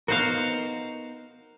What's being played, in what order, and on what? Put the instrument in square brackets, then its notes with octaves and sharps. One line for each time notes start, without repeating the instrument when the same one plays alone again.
[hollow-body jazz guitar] B3 D#4 A#4 [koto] F#4 C5 F5